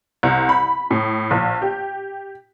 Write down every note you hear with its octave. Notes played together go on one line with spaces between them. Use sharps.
C2
B5
A2
A#1
G4